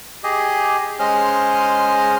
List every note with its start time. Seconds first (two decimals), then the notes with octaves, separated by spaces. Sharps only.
0.24 G4 G#4 D#5
0.99 G#3 C#4 C5 D#5 F6